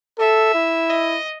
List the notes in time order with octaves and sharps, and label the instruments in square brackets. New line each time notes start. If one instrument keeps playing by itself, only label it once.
[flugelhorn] A4 [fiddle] E5
[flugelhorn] E4
[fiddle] D#5